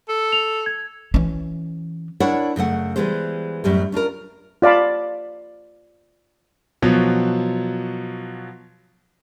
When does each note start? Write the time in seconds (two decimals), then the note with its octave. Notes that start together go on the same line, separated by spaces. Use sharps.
0.09 A4
0.32 F7
0.66 G#6
1.14 E3 C#4
2.20 D4 E4 A#4 C#5 D5 F#5
2.56 F#2 C#3 A3 F#5
2.96 E3 G3 G#3 B3 C5
3.64 F#2 A2 G3
3.92 C#4 D4 F4 A#4
4.62 F4 D5 F5 A5 B5
6.82 B2 F3 F#3